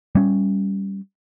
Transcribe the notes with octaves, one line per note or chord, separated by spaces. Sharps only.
G3 C#4